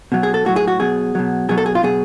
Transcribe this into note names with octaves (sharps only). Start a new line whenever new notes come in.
B2 F#3
G#4
A4
A2 F#3 F#4
G#4
F#4
B2 F#3 G#4
B2 F#3
B2 F#3 G#4
A4
G#4
F4
B2 F#3 G#4